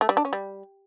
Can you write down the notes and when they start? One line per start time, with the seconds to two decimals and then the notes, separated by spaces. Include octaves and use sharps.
0.01 A3
0.09 G3
0.17 D4
0.25 C#4
0.33 G3